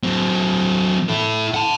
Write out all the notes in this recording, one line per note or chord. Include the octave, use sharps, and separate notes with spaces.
F#3 C4
E4 A4
F#5 A5